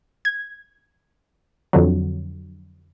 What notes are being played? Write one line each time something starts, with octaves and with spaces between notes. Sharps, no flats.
G#6
F2 D3 F#3